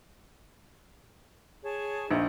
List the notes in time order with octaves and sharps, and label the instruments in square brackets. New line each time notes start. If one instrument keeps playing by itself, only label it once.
[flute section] G#4 C#5 A5
[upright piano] A#1 [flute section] D#4 F4